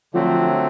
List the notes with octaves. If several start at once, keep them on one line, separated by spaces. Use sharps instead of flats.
D3 F3 F#3 A3 C4